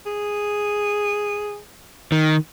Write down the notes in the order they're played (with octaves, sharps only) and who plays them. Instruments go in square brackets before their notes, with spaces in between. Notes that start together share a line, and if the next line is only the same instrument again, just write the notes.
[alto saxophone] G#4
[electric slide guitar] D#3